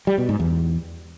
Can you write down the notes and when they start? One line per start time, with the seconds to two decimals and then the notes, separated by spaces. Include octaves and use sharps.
0.07 G3
0.18 B2
0.29 G#2
0.40 E2